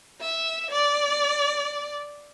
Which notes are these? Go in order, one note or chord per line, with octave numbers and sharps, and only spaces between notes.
E5
D5